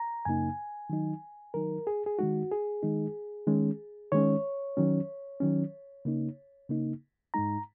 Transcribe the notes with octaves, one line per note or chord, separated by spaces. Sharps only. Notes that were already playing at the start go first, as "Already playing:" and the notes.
Already playing: A#5
F#2 C#3 A#3 D#4 G#5
D#3 F#3 D#4
D#3 F#3 D#4 A#4
G#4
G#4
D#3 G#3 D#4 F#4
G#4
D#3 G#3 D#4
D#3 G#3 C#4
D#3 G#3 C#4 C#5
D#3 F#3 C#4
D#3 F#3 C#4
C#3 A#3 D#4
C#3 A#3 D#4
G#2 G#3 D#4 A#5